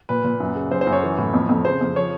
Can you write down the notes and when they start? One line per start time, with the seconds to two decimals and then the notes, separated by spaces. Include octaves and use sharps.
0.09 A#2 B4
0.24 A#2
0.40 F#2
0.55 C#3
0.71 F#2 C5
0.81 C5
0.87 F#2
0.92 C#5
1.03 E3
1.18 A2
1.34 F2
1.49 F2
1.65 C#3 C5
1.81 F2
1.96 F3 C#5